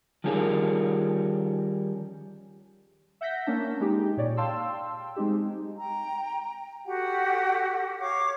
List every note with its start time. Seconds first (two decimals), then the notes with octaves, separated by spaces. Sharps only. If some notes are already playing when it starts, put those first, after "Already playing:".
0.24 D#3 F3 G3 C#4 G#4 A#4
3.21 E5 F#5 G6 A#6 B6
3.47 A#3 C#4 D4 A5
3.80 G#3 D#4 G4
4.17 A#2 C#5 D5
4.37 F5 G5 A5 C6 E6
5.16 G#3 C4 D#4 G4
5.78 G5 A#5
6.86 F#4 G4 A4 F#5
7.99 C#5 F5 C#6 D6